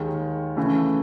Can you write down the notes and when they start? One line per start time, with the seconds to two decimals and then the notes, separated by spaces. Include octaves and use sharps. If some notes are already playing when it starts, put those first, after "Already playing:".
Already playing: D#2 D#3 G#3
0.56 C#3 E3 A3